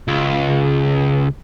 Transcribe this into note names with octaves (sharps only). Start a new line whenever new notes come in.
C#2